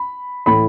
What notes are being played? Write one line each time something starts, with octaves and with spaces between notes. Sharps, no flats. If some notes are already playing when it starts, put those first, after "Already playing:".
Already playing: B5
A2 E3 B5